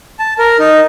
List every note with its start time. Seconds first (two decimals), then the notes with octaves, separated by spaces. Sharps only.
0.19 A5
0.39 A#4
0.59 D#4